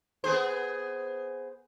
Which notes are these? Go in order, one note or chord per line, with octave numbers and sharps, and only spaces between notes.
B3 G#4 C5